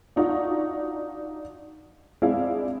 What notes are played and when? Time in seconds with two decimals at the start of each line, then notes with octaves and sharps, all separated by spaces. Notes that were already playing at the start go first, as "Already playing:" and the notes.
0.16 D4 D#4 F4 F#4
2.22 G#3 C4 D4 E4 G#4 F5